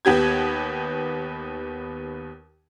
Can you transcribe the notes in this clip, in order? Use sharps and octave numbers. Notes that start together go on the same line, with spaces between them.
D#2 B3 G4 G#6